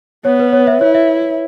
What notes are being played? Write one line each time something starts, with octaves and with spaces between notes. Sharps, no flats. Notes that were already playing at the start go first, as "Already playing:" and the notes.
B3 C#5
B4
C#5
E5
E4 C#5
E5